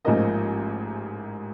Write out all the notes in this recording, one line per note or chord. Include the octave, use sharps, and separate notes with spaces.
A1 G#2 F3 A#3 D#5